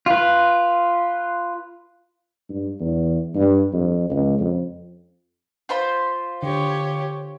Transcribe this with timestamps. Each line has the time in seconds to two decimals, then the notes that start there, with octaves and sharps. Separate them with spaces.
0.06 F4 B4
2.50 G2
2.80 E2
3.35 G2
3.73 F2
4.10 C#2
4.39 F2
5.69 F4 C5 B5
6.43 D3 G4 C#5